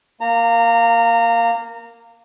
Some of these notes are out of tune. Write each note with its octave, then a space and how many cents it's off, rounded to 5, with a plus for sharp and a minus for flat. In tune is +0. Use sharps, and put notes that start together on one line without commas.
A#3 +0 A#5 -25